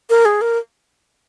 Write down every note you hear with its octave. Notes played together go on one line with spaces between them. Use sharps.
A#4
G#4
A#4